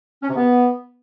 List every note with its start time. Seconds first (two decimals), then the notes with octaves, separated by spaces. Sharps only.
0.23 C#4
0.29 C3
0.36 B3